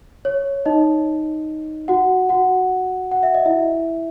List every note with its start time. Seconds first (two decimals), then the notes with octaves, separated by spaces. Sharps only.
0.25 C#5
0.66 D#4 D#5
1.88 F#4 F#5
2.29 F#4 F#5
3.12 F#5
3.23 E5
3.34 D#5
3.46 E4 E5